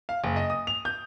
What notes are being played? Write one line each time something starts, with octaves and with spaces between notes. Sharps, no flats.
F5
F#1
D#5
D#6
F7
G6